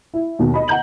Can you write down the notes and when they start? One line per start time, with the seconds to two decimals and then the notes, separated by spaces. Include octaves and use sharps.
0.14 E4
0.39 D#2 B2
0.54 D#5 B5
0.68 F#5 A#5 G6 F#7